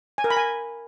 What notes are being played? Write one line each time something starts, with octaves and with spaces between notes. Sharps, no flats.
G#5
A#4
B5
G#5